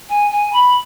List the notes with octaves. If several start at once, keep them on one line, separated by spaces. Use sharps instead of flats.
G#5
G#5
B5